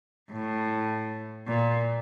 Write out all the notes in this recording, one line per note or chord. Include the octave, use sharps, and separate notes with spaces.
A2
A#2